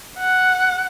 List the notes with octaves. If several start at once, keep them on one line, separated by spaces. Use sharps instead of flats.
F#5